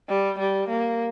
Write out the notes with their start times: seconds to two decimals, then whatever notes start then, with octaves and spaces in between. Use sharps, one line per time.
0.08 G3
0.39 G3
0.69 A#3